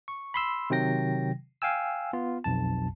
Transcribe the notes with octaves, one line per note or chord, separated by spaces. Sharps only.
C#6
B5 C6 E6
C3 D#3 F#3 G5 A#6
F5 G5 G#5 E6
B3 F4
B1 F2 A5